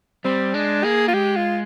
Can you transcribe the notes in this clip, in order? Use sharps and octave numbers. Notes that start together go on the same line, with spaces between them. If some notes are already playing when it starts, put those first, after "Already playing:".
G3 C4
G#3 D4
A#3 G#4
F4
G#3 G4
F4